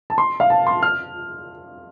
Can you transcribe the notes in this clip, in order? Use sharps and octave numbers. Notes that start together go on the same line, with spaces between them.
A5
C6
F5
A5
C6
F6